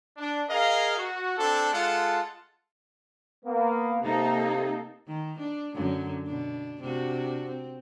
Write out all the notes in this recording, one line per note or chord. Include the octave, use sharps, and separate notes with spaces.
D4
G#4 A#4 D#5 F5
F#4
C4 D4 A4
G#3 F4 A4 F#5 A5
A#3 B3
C3 A#3 D#4 A4
D#3
D4
F#2 D3 F#3
B2 D4
C3 D4 F#4
C4